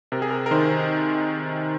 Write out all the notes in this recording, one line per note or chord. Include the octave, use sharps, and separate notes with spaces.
C3 A#4
G#4
A#4
A#4
D#3 C5